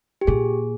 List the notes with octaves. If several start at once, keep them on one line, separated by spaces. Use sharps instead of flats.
G4
A#2 G#4